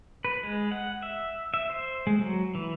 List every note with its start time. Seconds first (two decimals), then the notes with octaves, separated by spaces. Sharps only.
0.25 B4
0.43 G#3
0.72 F#5
1.02 E5
1.54 E5
1.70 C5
2.07 G#3
2.20 F#3
2.55 E3